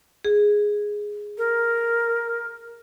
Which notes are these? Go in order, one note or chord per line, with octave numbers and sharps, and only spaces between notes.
G#4
A#4